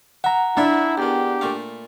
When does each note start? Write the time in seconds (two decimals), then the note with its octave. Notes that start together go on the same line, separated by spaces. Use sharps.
0.24 E5 F#5 A#5
0.57 D4 E4 F4 A4 E5
0.98 E2 D#3 G4
1.41 A#2 A3 F5